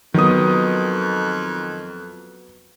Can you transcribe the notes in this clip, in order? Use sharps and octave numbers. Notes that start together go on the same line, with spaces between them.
F2 D#3 F#3 B3 D#6